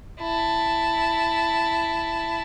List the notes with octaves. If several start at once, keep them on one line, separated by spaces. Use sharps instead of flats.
E4 A5